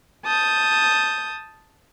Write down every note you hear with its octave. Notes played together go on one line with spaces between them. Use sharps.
A5 D#6 G6